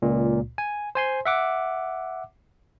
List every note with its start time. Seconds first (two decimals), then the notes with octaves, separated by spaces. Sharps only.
0.02 C#2 A#2
0.58 G#5
0.95 C5 G#5 C6
1.25 E5 F#5 D6